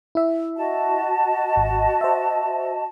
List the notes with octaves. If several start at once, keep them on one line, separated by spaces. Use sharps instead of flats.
E4 E5
F#4 D#5 A5
G#1
C5 E5